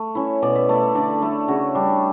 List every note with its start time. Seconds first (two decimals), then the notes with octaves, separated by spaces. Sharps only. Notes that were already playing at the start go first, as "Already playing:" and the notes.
Already playing: A3
0.15 C#4 E4
0.42 B2 D5
0.56 E5
0.69 A3 E4 D5
0.95 D3 D5
1.22 A3 E4
1.48 C#3 F#4
1.75 G3 D4